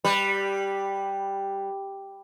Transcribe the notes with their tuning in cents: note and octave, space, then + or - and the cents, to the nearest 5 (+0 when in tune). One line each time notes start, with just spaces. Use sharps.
G3 +0 B4 +0